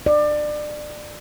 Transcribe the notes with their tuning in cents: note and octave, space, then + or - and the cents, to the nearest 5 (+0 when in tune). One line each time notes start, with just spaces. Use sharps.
D5 +25